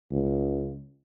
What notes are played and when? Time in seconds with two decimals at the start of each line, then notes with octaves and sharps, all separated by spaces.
0.11 C#2